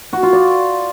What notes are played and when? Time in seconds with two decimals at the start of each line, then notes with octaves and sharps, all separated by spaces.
0.13 F#4
0.23 F4
0.33 D5